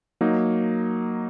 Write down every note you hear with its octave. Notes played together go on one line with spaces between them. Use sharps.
F#3 A#3 D#4